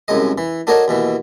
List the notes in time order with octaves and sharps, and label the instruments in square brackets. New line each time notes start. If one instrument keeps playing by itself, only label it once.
[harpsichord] C2 F#2 C#3 G#3 D#5
E3
D4 F#4 A4 A#4 C#5 D#5
D#2 B2 E3